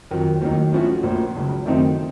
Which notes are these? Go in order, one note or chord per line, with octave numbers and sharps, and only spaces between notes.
F2 D#3 F#3
D#2 D#3 F#3 A#3 D#4
A2 F3 A3 C#4 F#4
A#1 A#2 F3
C#2 C#3 F#3
F#2 D#3 A3 C4 D#4